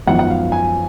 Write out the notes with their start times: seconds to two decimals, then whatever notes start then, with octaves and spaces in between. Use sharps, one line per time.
0.06 G#1 F#2 F3 B3 F#5
0.19 F#5
0.30 F5
0.52 G#5